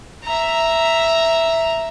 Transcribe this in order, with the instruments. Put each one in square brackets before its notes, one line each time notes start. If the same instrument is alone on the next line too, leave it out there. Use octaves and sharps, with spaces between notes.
[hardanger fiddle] E5 A#5